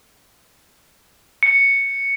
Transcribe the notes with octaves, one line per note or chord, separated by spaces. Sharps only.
C#7